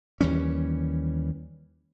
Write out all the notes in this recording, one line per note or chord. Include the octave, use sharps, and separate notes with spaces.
D#2 E3 G3 C#4